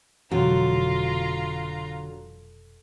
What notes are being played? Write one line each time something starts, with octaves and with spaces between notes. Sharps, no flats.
F1 B2 D3 E3 F#3 F4 A#5